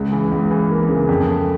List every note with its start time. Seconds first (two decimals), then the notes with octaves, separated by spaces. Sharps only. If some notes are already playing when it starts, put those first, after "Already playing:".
Already playing: C#2 C#3
0.12 E3
0.32 C#2
0.51 E3
0.70 A#3
0.89 C#3
1.09 F2
1.28 A3